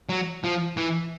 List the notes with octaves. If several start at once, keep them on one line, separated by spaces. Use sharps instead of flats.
F#3
F3
E3